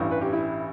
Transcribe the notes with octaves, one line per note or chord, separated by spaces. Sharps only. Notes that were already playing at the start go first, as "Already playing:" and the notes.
Already playing: A1 G2 E3
B4
G4
E4